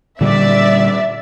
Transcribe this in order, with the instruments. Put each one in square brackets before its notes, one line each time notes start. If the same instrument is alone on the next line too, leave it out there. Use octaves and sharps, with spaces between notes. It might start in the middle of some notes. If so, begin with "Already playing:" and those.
[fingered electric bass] A#2 D3 G3 [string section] D5 E5